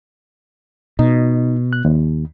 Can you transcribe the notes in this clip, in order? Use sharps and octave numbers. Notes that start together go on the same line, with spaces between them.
B2 D#4
F#6
D#2